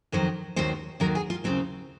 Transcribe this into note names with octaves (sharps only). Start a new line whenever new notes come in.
F2 D#3 F#3 C5
D#2 D#3 F#3 C5
D#2 D#3 F#3 A#4
G#4
F4
D#2 C#3 F#3 C4